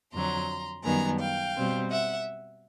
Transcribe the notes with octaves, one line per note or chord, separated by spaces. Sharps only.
F2 D3 F#3 A#5 C6
F#2 D#3 G3 B3 G#5 A#5
F5 G5
B2 G3 C4
E5 F#5